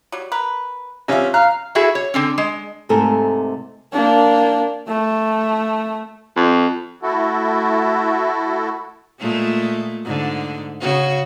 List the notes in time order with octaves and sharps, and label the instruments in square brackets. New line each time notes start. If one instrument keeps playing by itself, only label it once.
[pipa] F#3 G3
A#4 B4
[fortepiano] C3 C#4 F4 [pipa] B3 E5
[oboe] F5 [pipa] A#5 [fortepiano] F#6
[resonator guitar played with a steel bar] E4 F#4 G#4 A4 E5
C#5
D3 C4 C#4
G#3
[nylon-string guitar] G#2 C3 A3 A4 A#4 G#5
[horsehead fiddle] A#3 D4
A3
[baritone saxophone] F2
[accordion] A3 E4 F#4 A4
[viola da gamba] A#2 G#3 A3
G#2 D3
C#3 F#4